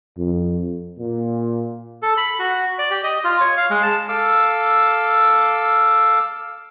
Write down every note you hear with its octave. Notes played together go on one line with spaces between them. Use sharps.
F2
A#2
A4
B5
F#4
D5
G4
D#5
F4
C#5
F5
G#3
A5
A4 F5 D6 E6